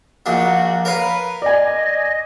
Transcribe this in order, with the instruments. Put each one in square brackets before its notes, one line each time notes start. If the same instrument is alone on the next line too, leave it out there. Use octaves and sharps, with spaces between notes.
[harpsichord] A#1 A#2 D4 [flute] F#4
[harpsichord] A#4 C#5 F5 [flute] B4
[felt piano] D5 G#5 [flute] D#5